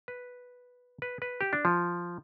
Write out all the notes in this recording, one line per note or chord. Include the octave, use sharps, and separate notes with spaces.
B4
B4
B4
G4
D4
F3